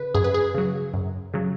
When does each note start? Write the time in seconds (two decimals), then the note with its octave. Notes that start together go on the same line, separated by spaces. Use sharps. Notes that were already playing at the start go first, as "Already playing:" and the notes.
Already playing: C#3 B4
0.14 F#2 G#4
0.24 B4
0.34 G#4
0.54 C#3 F#3
0.94 F#2
1.34 C#3 F#3